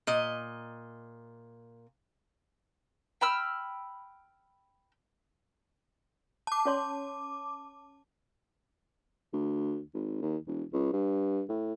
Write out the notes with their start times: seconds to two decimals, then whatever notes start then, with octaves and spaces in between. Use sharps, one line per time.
0.07 A#2 D#5
3.21 G5 B5 E6 F6
6.47 A5 D6
6.65 C#4 C#5 C6
9.33 D2
9.94 G#1
10.21 D#2
10.47 E1
10.73 C#2
10.93 G2
11.49 A2